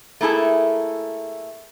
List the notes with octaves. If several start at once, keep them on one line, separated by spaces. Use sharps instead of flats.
A3 A#3 E4 G#4 A4